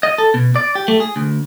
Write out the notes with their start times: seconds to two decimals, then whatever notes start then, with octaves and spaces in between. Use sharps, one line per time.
0.03 D#5
0.18 A4
0.34 B2
0.56 D5
0.75 G4
0.88 A3
1.00 G#4
1.16 D2